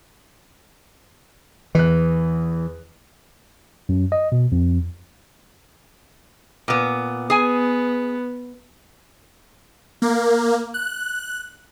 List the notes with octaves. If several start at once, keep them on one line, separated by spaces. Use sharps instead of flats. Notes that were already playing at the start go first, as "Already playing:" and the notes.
E2 E3 F#6
F#2
D#5
B2
F2
A#2 B3
B3 G#4 G#5
A#3
F#6